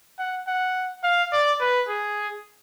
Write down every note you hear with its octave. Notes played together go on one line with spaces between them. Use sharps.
F#5
F#5
F5
D5
B4
G#4